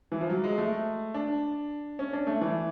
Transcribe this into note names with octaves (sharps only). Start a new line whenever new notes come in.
E3
F3
F#3
G#3
A3
D4
C#4
D4
A3
E3